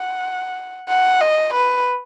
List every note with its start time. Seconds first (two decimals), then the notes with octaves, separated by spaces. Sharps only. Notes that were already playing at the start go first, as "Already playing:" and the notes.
Already playing: F#5
0.89 F#5
1.21 D#5
1.54 B4